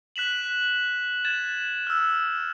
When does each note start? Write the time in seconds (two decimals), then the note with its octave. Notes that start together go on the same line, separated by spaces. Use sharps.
0.16 F#6 B6 E7 F#7
1.25 G#6 A6 E7
1.87 E6 F6